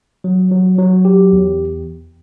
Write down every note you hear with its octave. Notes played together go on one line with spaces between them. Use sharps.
F#3
F#3
F#3
G4
E2